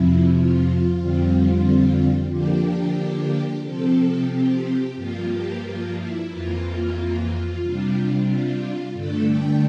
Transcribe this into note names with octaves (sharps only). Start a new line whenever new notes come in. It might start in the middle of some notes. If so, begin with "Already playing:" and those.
Already playing: F2 C3 F3 E4
F4
F2 D3 G3 C4
D3 F3 A#3 D4 G4
G4
C3 F3 C4 A4
G4
G2 F3 A#3 F4
G4
F4
E4
F2 E3 A#3 F4
C3 G3 D4
F4
G2 D3 A3 D4 A4
G5